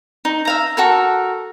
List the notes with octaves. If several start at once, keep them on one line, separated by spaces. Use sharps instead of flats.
D#4
E5 F5 A#5
F#4 A4 A#4